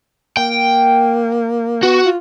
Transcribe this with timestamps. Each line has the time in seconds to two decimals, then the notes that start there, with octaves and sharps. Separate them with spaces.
0.37 A#3 G5
1.83 B3 F#4
2.06 F4